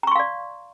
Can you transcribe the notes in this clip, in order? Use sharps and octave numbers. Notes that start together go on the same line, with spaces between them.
D5 F5 A#5 C6 C#6